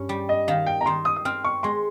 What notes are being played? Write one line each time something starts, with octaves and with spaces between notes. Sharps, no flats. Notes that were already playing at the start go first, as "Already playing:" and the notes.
Already playing: G2 C#4
G3
D#5
D#3 F5
G5
A#5
D#3 C6
D#6
D#6
C4 F6
C#6
G#3 C6